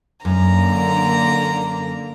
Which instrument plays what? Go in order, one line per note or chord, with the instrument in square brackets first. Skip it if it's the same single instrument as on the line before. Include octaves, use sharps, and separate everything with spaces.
[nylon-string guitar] F#2 [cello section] D3 A#3 [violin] A#5